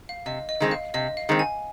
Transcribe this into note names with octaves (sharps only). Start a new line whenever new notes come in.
F5
C3 D#5
D#5
D#3 G#3 C4
F5
C3 D#5
F5
D#3 G#3 C4
G#5